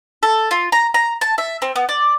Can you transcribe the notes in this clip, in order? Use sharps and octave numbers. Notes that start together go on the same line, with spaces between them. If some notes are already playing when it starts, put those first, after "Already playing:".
A4
F4
A#5
A#5
A5
E5
C4
B3
D5